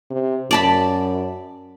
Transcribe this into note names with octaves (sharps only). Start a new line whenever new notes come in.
C3
F#2 D5 A5 B5